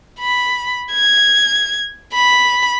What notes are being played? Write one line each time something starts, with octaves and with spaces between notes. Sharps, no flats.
B5
G#6
B5